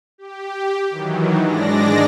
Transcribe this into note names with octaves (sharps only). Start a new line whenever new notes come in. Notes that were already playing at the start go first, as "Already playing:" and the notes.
G4
D#3 E3 F#3
G#2 G#3 D4 D5 A#6